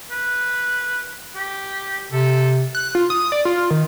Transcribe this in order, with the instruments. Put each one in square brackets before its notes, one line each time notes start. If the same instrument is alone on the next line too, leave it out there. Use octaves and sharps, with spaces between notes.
[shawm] B4
G4
[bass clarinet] C3 [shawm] A4
[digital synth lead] F#6
F4
D#6
D5
F4
D#3